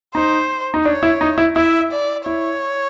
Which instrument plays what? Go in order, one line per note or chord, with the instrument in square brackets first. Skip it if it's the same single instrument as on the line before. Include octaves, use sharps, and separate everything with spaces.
[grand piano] D#4 [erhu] C5
[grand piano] D#4
[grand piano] D4 [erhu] C#5
[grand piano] E4
D#4
E4
[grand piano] E4 [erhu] E5
[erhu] D5
[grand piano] E4 [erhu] C#5